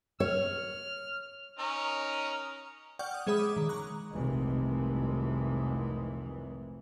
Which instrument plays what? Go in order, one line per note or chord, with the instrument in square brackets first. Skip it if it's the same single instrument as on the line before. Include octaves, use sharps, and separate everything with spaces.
[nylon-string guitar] C#5 [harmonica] F6
[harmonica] C#4 D#4 A#4
[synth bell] D5 F#5 G5 C#6 F6 G6
D#6 F6
G#3 G#4 C#5 E5 B5 D#6
D6
D#3
A#5 C#6 F#6
[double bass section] F1 C2 C3 D#3 E3 G#3